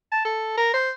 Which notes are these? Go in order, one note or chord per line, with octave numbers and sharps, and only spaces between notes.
A5
A4
A#4
C5